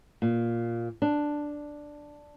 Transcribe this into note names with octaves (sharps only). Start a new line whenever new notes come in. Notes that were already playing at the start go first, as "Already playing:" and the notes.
A#2
D4